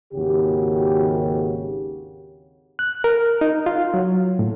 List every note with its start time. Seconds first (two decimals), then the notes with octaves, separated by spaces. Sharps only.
0.14 G#1 D#2 C#3 F#4 G4
2.79 F#6
3.04 A#4
3.41 D#4
3.66 F4
3.94 F#3
4.39 A2